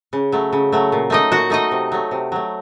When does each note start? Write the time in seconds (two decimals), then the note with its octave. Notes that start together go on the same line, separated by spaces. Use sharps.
0.13 C#3
0.32 F#3 A3
0.53 C#3
0.72 F#3 A3
0.92 A#2
1.10 A3 D#4 D#5
1.31 A#2 F#4 F#5
1.50 A3 D#4 D#5
1.71 C3
1.92 F#3 A3
2.11 C3
2.32 F#3 A3